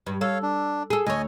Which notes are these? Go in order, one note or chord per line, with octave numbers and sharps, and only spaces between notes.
G2
A4 C#5 F5
D4
G#4 A4
D2 C#5 D#5 G#5